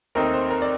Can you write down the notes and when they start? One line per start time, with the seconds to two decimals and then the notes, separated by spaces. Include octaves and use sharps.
0.15 D#2 D#3 A3 C4 D#4 A#4
0.34 C5
0.50 A#4
0.62 D5